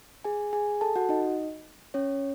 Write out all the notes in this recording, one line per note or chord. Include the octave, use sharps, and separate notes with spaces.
G#4 G#5
G#4 G#5
A4 A5
F#4 F#5
D#4 D#5
C#4 C#5